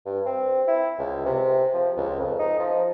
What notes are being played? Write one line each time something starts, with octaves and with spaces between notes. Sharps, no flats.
G2
C4
E4
C#2
C3
F3
C#2
F2
D#4
F3